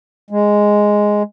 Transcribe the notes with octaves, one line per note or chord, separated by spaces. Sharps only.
G#3